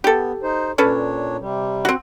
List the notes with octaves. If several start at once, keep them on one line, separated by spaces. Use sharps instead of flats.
B3 G4 A4
D#4 C5
A#2 C#4 D4 A4 B4 C#5
C3 G3
C4 F#4